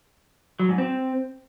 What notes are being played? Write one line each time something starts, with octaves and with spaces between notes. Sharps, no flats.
F#3
G#2
C4